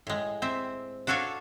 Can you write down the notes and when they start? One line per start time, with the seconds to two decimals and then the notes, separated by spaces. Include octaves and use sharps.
0.07 A2 G#3
0.42 C4 E5
1.07 D4 F#4 A4 C#5 F5